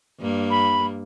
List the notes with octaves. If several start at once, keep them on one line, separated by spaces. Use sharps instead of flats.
G2 A#3
B5